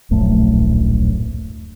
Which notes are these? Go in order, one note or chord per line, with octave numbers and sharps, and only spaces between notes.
D1 A#1 F#2 A3